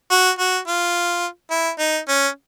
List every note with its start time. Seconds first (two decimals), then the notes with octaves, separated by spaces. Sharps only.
0.11 F#4
0.39 F#4
0.67 F4
1.51 E4
1.79 D#4
2.08 C#4